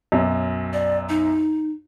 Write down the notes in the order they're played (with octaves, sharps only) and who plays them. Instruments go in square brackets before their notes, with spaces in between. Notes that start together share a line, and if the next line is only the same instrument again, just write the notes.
[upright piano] B1 F#2
[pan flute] D5
D#4